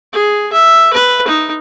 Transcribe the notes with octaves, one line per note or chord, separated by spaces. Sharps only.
G#4
E5
B4
D#4